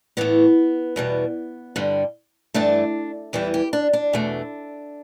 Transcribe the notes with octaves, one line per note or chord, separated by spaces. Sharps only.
A2 E3 A3 B3
E2 B2 G3
G2 D3 G3
G2 E3 A3 D4
E2 E3 G3 E4
G4
D4
D4
E2 B2 A3